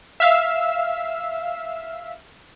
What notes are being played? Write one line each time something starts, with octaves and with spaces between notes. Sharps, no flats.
E5 F5 E6